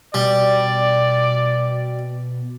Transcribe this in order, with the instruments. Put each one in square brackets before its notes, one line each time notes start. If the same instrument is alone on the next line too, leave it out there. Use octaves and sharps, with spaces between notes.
[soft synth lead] B2 [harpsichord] G3 [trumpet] D5